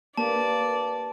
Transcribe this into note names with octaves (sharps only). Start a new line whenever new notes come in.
A#3 D4 G4 B4 D5 A5